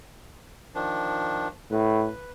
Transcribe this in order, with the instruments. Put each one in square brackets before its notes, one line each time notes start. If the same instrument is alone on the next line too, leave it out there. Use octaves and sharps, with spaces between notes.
[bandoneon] D#3 F3 D4
[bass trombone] A2 [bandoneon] B4